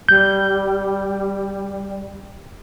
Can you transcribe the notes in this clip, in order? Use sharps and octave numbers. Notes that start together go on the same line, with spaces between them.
G3 G6